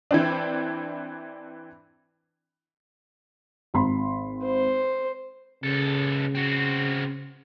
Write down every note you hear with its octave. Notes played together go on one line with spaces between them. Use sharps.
E3 C4 D4
G#1 B5 C6
C5
C#2 C#3 A4
C4 F#4